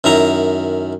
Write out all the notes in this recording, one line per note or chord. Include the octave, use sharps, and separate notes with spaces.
F#2 D#3 E4 A#5